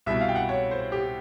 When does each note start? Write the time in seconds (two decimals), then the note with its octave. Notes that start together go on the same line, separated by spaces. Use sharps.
0.06 C2 B2 E5
0.21 F5
0.28 G5
0.35 F#5
0.49 C#5
0.71 C5
0.92 G4